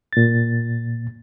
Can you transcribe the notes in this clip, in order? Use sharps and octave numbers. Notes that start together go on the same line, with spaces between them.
A#2 A6